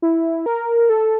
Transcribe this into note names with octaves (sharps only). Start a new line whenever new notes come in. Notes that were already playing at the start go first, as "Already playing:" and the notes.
E4
A#4
A4